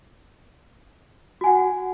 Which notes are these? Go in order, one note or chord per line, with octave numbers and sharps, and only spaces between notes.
F#4 F#5 G#5